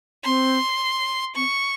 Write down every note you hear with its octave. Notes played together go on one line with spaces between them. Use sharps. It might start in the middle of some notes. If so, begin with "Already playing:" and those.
C4 C6
C4 C#6